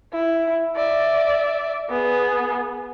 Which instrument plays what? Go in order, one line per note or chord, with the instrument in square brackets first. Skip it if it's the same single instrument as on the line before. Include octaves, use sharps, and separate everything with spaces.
[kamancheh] E4
D5 E5
B3 G#4